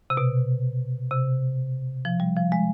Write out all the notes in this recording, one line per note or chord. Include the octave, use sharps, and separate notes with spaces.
C3
B2
C3
F3
G3
F3
G#3